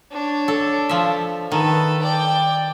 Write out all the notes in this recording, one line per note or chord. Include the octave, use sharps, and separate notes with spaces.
D4 C#5
A4
F3 E5
D#3 A4 B4
D5 G5